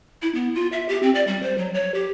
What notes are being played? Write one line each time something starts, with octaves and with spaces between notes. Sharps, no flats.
E4
B3
F4
E5
G4
C4
D5
G3
C5
F#3
C#5
G4